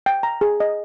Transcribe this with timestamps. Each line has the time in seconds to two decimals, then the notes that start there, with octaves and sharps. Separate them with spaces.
0.06 G5
0.23 A#5
0.41 G#4
0.60 D#5